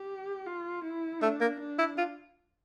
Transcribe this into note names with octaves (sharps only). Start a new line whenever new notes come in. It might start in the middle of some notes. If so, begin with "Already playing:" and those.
Already playing: G4
F4
E4
A3 D4
A#3
D4
E4
F4